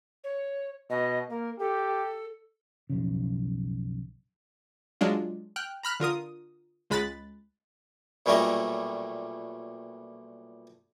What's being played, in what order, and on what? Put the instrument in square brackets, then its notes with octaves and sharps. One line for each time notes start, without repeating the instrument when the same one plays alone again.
[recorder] C#5
[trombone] B2 [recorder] D#5
[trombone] A#3 [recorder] A#4
[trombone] G4 [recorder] A4
[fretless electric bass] B1 F2 C#3
[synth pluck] F#3 G#3 D4 F4
G5 F6 F#6
A#5 B5 F6 F#6
D3 F4 A#4 D#6
C#2 G#3 B5 F#6 A6
[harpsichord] B1 A#2 G3 A3 C#4 D#5